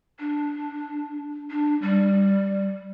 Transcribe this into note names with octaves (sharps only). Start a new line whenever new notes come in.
D4
D4
G3